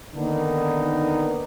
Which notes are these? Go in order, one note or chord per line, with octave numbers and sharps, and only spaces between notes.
D3 D#3 A#3 B3 D4 D#4